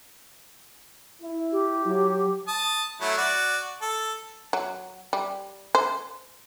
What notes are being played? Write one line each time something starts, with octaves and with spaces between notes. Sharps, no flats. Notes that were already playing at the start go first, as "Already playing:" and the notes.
E4
G4
F#3
A5 D#6
F#3 A3 E4
F#4 D5
A4
F#3
G3
C5